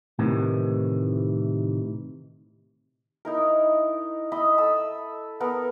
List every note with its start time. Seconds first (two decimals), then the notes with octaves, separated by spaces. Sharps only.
0.19 A2 C3 D#3 E3
3.25 D#4 E4 A#4
4.32 D#5 E5 B5
4.58 A4 E5 D#6 E6
5.40 B3 A4 A#4